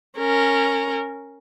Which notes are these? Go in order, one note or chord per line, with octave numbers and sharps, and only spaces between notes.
C#4 A#4